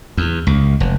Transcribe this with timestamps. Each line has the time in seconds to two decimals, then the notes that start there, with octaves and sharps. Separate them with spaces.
0.17 E2
0.47 C#2
0.80 F1